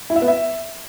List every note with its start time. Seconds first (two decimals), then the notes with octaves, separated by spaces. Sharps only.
0.10 E4
0.16 E5
0.22 B3
0.28 E5